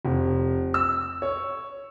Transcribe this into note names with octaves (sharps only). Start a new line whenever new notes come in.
F1
E6
C#5